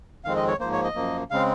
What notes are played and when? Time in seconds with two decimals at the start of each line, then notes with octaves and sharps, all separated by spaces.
0.25 F2 D#3 G#3 C4 F5
0.36 D#5
0.48 C#5
0.60 G#2 F3 A#3 C5
0.72 C#5
0.84 D#5
0.95 F#2 F3 A#3
1.30 C#3 G#3 C4 F5